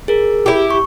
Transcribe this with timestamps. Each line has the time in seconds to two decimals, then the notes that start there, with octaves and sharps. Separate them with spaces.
0.08 G#4 A#4
0.46 E4 G4
0.71 C#6